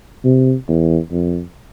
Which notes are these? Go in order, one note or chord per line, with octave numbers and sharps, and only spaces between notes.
C3
E2
F2